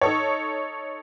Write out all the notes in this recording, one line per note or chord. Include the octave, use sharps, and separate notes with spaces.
D#4 A4 C#5